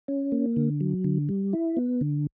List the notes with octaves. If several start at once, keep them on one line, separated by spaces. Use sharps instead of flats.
C#4
A#3
D3
F#3
D3
G3
E4
B3
D3